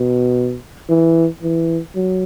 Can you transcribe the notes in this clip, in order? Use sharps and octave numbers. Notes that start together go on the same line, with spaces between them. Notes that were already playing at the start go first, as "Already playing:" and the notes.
Already playing: B2
E3
E3
F#3